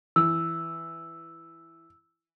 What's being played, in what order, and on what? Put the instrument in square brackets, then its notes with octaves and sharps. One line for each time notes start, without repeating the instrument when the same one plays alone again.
[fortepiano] E3 [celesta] E6